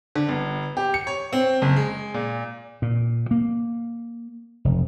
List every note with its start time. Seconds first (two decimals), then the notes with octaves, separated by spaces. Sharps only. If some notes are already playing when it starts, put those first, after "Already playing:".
0.16 D3
0.29 G1
0.77 G4
0.94 C#7
1.07 C#5
1.33 C4
1.62 F#1
1.77 G#3
2.14 A#2
2.82 A#2
3.31 A#3
4.65 F1